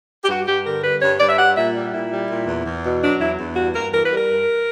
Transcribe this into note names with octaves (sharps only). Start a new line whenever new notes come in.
G4
G2 F#4
G2 G4
D3 A#4
G3 B4
G2 C#5
G2 D5
E5
G3 F#5
A#2 E5
G3
A#2 E4
G3
A#2
E2
E2
B2
F#3 D4
E2 E4
E2
G2 F#4
G2 A#4
E3 A#4
B4
G3
A#4
G2